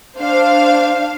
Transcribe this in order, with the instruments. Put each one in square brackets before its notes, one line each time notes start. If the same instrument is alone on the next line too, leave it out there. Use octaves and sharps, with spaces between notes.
[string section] D4 C5 F5